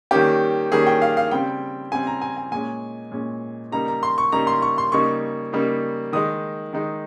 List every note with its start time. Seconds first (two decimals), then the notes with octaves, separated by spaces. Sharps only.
0.11 D#3 G3 A#3 C#4 G4
0.72 D#3 G3 A#3 C#4 G#4
0.87 G5
1.02 F5
1.17 F5
1.31 C#3 G3 C4 G5
1.92 C#3 G3 C4 G#5
2.07 A#5
2.22 G#5
2.37 G#5
2.51 A#2 G#3 C#4 G#5
3.12 A#2 G#3 C#4
3.72 C#3 G3 A#3 D#4 A#5
3.88 A#5
4.03 C6
4.18 C#6
4.32 C#3 G3 A#3 D#4 A#5
4.47 C6
4.62 C#6
4.78 C6
4.92 C#3 G3 A#3 D#4 C#6
5.53 C#3 G3 A#3 D#4
6.13 D#3 G#3 D#4 D#6
6.73 D#3 G#3 D#4